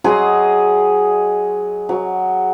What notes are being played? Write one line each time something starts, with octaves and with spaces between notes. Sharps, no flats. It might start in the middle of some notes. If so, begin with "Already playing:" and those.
F#3 G#4 D#5 C6
F#3